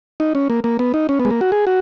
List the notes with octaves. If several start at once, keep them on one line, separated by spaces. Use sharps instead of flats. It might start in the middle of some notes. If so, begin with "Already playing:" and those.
D#4
C#4
A#3
A#3
B3
D#4
C#4
B3
G#3
A#3
F#4
G#4
F#4